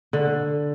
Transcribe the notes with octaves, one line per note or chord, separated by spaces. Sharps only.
D3